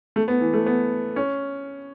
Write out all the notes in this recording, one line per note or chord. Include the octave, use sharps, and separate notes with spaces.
A3
B3
E3
A3
B3
C#4